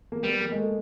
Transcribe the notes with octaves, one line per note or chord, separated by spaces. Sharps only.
A#3
G3 B3
A#3
G#3
A3